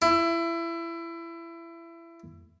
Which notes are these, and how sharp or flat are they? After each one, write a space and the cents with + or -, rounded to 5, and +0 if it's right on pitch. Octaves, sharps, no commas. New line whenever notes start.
E4 +25